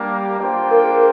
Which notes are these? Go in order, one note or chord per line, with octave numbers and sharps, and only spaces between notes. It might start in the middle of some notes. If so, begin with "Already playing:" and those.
Already playing: G3 A#3 D4 G4 A#4
A#3 D4 F4 C5 D5 G5
A#4
G#4
A#4